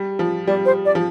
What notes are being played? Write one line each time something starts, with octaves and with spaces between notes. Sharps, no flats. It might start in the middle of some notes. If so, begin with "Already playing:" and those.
Already playing: G3
F3
G3 D5
C5
D5
F3